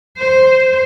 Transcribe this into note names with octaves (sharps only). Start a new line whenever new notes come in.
C5